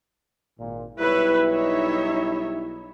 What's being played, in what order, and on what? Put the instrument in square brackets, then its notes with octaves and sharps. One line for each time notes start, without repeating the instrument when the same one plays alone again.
[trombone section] G#1 A#2
[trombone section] B1 G3 E4 [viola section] B4 C#5 E5
[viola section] D#4 C#5 E5